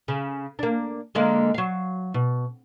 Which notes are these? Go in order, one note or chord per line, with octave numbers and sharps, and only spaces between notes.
C#3
A#3 D4
D3 G#3 A#3
F#3 F5
B2